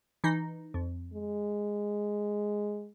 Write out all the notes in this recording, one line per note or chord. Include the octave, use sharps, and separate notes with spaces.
E3 D#4
F2
G#3